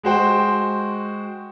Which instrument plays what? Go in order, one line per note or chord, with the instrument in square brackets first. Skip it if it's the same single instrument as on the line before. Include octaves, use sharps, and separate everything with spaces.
[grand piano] G#3 F#4 C5 G5